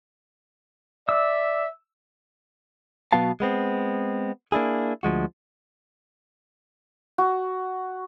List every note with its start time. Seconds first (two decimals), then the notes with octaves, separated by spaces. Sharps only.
1.09 D5 E5 E6
3.13 B2 F#3 B3 F#4 F5 A5
3.40 G#3 B3 C4
4.52 A#3 D4 E4 G#4
5.03 D2 F3 G#3 F#4
7.18 F#4